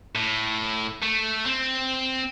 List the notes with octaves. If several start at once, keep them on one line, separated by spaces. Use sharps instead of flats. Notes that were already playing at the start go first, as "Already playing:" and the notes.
A2
A3
C4